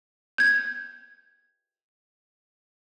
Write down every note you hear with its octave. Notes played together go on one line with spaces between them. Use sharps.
G6 G#6